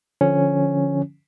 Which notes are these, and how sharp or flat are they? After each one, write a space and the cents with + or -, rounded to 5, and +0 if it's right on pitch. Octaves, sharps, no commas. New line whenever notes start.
D3 -10 F3 -10 C#4 +0